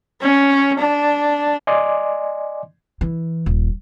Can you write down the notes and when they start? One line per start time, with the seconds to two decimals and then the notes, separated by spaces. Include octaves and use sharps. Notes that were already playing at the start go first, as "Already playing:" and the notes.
0.21 C#4
0.79 D4
1.67 D5 D#5 G#5 C6 D6
3.01 E3
3.46 D#1